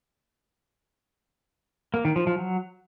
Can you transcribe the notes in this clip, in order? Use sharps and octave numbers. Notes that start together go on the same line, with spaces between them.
A#3
D#3
F3
F3
F#3